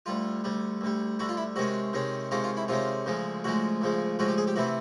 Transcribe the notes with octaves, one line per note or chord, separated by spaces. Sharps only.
D2 D3 G3 F4
D2 D3 G3
D2 D3 G3
D2 D3 G3 F#4
F4
E4
C3 D#3 G#3 C#4 F#4
C3 D#3 G#3 C#4
C3 D#3 G#3 C#4 F4
F4
E4
C3 D#3 G#3 C#4 F4
D2 C#3 F3 G#3
D2 C#3 F3 G#3 F#4
D2 C#3 F3 G#3
D2 C#3 F3 G#3 F#4
G4
G#4
G4
C3 E3 A3 C4 E4 F#4